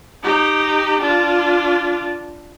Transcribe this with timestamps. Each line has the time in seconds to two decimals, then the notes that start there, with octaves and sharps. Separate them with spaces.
0.23 D#4 G4
1.01 D4 F4